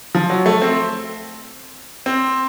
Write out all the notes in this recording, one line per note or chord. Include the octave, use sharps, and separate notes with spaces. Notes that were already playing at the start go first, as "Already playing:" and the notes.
F3
F#3
A3
C4
C4